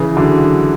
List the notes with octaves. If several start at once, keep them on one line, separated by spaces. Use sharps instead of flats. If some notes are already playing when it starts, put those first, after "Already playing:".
Already playing: C#3 E3
D3 F#3